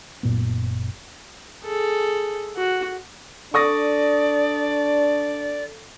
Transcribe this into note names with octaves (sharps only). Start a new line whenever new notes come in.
F#1 A#2 B3
G#4 A4
F#4
D4 A4 D5 C#6 D#6 A#6